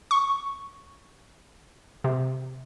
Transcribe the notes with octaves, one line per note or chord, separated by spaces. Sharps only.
C#6
C3